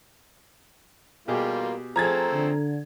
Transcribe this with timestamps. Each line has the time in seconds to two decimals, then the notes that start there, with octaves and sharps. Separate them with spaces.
1.28 B2 G3 A#3 F4 G4 G#4
1.96 F3 A3 C4 G#4 A#5 G#6 A6
2.33 D3